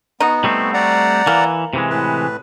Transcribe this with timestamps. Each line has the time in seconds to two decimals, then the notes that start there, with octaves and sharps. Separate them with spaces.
0.20 B3 D#4 F#4
0.44 G3 A3 C4
0.74 D5 F#5 A#5
1.27 E3 A#3
1.73 C3 E3 G#3
1.90 A2 B4